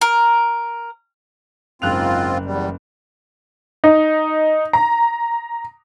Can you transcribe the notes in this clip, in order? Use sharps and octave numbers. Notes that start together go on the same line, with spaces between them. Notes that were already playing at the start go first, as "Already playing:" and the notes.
A#4
F#1 G#2 C4 F4 F#6 F7
E2 G3
D#4
A#5